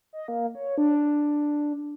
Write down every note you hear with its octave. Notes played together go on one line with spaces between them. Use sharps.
D#5
A#3
C#5
D4